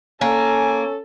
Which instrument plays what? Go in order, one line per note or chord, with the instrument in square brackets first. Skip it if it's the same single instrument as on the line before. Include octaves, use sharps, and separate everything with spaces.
[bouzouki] A#3 [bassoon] C#4 [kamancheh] A4 [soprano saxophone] G#5